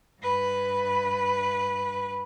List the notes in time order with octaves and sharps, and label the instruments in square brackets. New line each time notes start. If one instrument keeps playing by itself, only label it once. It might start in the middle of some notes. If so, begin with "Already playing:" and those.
[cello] G2 B4